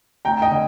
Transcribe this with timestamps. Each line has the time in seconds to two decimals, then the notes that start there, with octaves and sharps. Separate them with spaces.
0.25 D2 G5 A#5
0.42 D#5 G5
0.51 D3